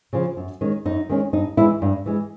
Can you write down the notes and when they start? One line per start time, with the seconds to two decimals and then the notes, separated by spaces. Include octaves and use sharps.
0.13 C#3 F3
0.37 F#2
0.61 D#3 G#3 C#4
0.85 F#2 D#4
1.10 D#3 G#3 C#4
1.33 G2 D#4
1.57 E3 G#3 E4
1.82 G2
2.06 E3 G#3